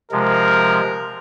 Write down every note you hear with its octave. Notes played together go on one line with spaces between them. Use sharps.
C3 F3 G#3 A#4